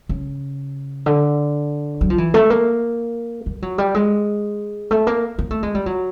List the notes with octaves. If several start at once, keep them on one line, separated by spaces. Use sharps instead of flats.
C#3
D3
F#3
F3
E3
A3
A#3
G3
F#3
G3
G#3
A3
A#3
A#3
A3
G#3
G3
F#3